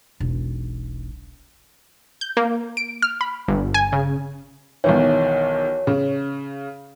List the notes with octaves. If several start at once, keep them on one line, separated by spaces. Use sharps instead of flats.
E1 B1
G6
A#3
D7
F6
B5
G1
G#5
C#3
B1 D#3 E3 C#5
C#3